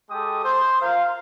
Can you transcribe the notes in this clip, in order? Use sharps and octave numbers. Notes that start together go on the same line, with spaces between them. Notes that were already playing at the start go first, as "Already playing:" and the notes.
G#3 G4 A4 D#6
C5
F4 A#4 F5